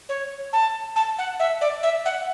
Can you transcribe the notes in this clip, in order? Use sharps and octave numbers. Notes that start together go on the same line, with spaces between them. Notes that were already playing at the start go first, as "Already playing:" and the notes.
C#5
A5
A5
F#5
E5
D5
E5
F#5